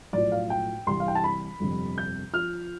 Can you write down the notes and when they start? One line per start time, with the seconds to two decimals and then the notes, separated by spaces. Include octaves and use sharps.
0.13 B1 A2 F3 D5
0.32 F5
0.50 G5
0.87 C2 C3 E3 C6
1.00 F5
1.08 G5
1.15 A5
1.24 B5
1.60 G1 F2 C3
1.98 G6
2.33 F3 F6